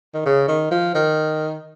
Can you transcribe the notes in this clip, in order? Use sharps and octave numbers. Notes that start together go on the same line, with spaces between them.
D#3
C#3
D#3
F3
D#3